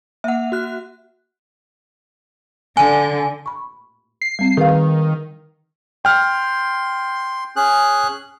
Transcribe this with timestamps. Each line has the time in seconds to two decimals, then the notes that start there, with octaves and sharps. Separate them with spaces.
0.24 A#3 E5 F#5
0.52 F#4 F#6
2.77 D3 G#5
3.46 B5 C#6
4.22 C7
4.39 G3 C4
4.57 D#3 G#4 B4 F5
6.05 G5 C6 F6
7.56 C#4 G#4 F#6